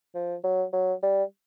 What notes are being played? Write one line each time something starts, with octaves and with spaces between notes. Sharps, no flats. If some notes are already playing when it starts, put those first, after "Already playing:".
F3
F#3
F#3
G3